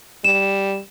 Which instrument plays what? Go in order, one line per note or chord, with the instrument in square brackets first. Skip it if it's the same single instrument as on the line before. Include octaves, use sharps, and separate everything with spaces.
[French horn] G3 [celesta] E7